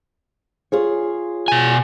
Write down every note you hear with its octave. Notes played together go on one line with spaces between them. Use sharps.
F4 G#4 C#5
B2 G#5